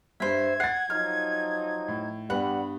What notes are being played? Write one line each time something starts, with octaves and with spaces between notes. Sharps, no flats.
G2 G3 C5 E5 G#6
F#5 A6 C7
F3 F#3 D#4 F6
A2
G2 G3 B3 F#5 B5